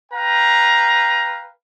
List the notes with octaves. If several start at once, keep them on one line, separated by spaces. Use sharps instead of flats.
B4 F5 G5 A#5